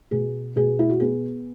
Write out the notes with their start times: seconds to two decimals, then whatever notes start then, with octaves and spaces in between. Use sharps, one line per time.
0.11 B2 G#4
0.56 B2 G#4
0.79 E4
0.89 F#4
1.00 B3 G#4